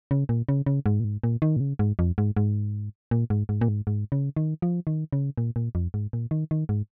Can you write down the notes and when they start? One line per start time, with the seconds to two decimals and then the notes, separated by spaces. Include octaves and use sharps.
0.11 C#3
0.29 A#2
0.49 C#3
0.66 C#3
0.86 G#2
1.00 A#2
1.04 G#2
1.24 A#2
1.42 D#3
1.56 A#2
1.60 C#3
1.79 G#2
1.99 F2
2.18 G#2
2.37 G#2
3.11 A#2
3.30 G#2
3.49 G#2
3.61 A#2
3.68 G#2
3.87 G#2
4.12 C#3
4.37 D#3
4.62 F3
4.87 D#3
5.13 C#3
5.38 A#2
5.56 A#2
5.75 F2
5.94 G#2
6.13 A#2
6.31 D#3
6.51 D#3
6.69 G#2